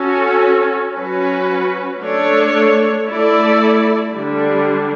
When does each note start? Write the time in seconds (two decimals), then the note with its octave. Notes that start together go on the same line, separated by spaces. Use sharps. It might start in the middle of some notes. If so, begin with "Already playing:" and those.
Already playing: C#4 F#4 A4
0.94 F#3 C#4 F#4 B4
2.01 A3 D4 A4 C#5
3.08 A3 E4 A4 D5
4.15 D3 G3 D4